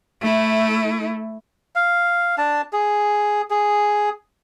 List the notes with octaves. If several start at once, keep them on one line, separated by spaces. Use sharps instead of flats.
A3 E4
F5
D4 A5
G#4
G#4